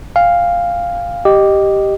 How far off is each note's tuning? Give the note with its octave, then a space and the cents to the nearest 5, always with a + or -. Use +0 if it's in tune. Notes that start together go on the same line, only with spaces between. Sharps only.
F5 +0 G#5 -45
G4 -5 D#5 -10